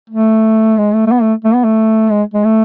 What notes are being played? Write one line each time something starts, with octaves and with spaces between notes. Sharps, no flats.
A3
G#3
A3
A3
B3
A3
A3
B3
A3
G#3
G#3
A3